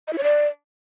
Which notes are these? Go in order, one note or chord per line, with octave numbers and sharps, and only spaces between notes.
D#5
E4
C#5
D5